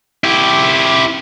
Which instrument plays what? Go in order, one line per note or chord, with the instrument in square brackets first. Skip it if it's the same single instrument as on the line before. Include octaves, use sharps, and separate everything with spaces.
[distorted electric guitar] E4 G4